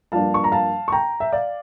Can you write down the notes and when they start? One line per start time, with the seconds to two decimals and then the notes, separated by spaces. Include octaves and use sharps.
0.12 G2 F3 A#3 D4 F5 A5
0.34 C#6
0.44 A#5
0.52 F5 A5
0.88 C#6
0.92 G5 A#5
1.20 E5
1.33 D5 F5